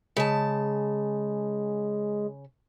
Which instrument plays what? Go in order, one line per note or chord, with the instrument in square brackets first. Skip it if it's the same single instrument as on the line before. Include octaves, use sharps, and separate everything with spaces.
[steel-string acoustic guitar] C#3 A5 [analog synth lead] G#3